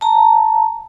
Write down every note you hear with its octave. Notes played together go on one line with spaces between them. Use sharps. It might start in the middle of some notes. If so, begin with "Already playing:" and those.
A5 A#5